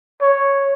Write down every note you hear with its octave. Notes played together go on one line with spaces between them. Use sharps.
C#5